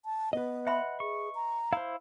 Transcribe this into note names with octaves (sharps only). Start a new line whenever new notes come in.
A5
B3 B4 D#5
E5 F#5 B5 C6
G#4 C#6
A#5
E4 C5 F5